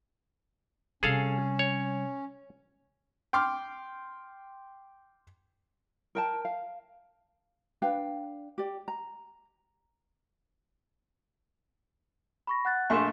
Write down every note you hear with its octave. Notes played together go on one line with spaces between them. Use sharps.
C3 G3 C#4 G#4 A4 F5
C#5
G5 C6 D6 F6
A#4 G5 A5
F5
D4 B4 F5 G5
G4 D5
A#5
B5 C#6 A#6
F#5 F#6 A6
A#1 A3 G#5 C6 C#6 E7